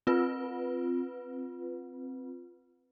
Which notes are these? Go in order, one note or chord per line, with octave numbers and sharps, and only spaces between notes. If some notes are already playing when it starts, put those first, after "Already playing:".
C4 F4 B4